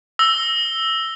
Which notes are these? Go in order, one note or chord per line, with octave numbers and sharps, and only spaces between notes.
E6 A#6 G7